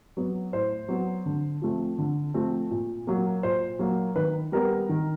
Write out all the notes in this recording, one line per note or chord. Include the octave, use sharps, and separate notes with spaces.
F#3 B3
A2 C5
F#3 B3
D3
F3 A3 C4
D3
F3 A3 C4
A#2
F#3 A#3
A#2 C5
F#3 A#3
D#3 B4
G3 B3 A#4
D#3